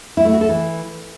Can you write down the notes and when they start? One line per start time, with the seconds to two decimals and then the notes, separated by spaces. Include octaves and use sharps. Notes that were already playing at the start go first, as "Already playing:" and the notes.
0.17 E4
0.25 A3
0.33 F#4
0.41 A4
0.49 E3